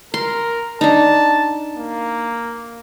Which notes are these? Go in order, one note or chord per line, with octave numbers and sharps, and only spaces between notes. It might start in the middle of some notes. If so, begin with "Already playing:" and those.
A#4 C6
D4 D#4 A5
A#3